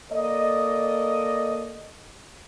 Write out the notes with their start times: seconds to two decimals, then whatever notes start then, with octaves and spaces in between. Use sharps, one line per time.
0.12 A#3 A4 D5 D#5